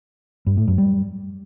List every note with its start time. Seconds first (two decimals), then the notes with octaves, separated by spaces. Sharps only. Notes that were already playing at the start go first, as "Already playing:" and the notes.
0.47 G2
0.57 A2
0.68 F#2
0.78 G3